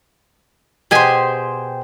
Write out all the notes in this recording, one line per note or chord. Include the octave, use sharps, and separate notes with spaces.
B2 G4 G#4 C5 G#5